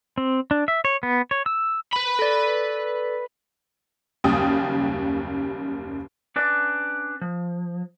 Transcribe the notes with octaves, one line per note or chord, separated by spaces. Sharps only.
C4
D4
E5
C#5
B3
C#5
E6
B4 B5
A4 D5
F#1 D#2 C#3 G3 G5 D#6
C#4 D4 B4 D5
F3